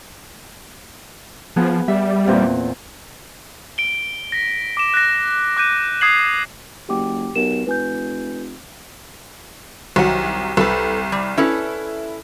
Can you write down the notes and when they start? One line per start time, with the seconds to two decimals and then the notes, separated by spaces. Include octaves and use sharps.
1.56 F3 B3 G#4
1.88 G3 E5
2.27 E2 A#2 C4
3.78 D7 G7
4.32 A#6 B6
4.77 D6 E7
4.94 F#6 A#6
5.57 D6 F#6 G6 D#7
6.01 D#6 G#6 C7 F#7
6.89 F#1 G4 G5 D6
7.36 B1 G4 A#4 E7
7.67 F1 B4 G#5 G6
9.96 C2 D#3 F#3 F#5
10.57 C2 A4 B4
11.12 G3
11.37 C#4 E4 A4 B4